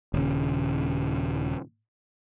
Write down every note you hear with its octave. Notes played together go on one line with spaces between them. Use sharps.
D#1 C#3